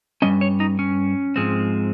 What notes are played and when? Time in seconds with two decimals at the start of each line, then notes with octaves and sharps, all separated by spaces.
0.22 G2 G3 C#4 D#5
0.41 C#5
0.60 D#4
0.79 C#4
1.36 G#2 F3 G#3 C4